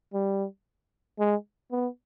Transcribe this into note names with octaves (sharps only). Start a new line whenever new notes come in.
G3
G#3
B3